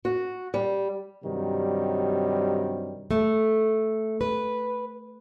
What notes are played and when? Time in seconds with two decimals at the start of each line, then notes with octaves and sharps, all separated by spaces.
0.05 F#4
0.54 G3
1.24 G2 C3 D#3 F#3 G3
3.11 A3
4.21 B4